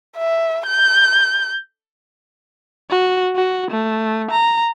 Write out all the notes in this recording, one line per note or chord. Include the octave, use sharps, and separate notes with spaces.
E5
G6
F#4
F#4
A3
A#5